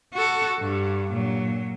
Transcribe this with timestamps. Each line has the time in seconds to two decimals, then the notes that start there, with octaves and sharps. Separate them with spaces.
0.14 F#4 A4
0.60 G2
1.12 A#2 F#3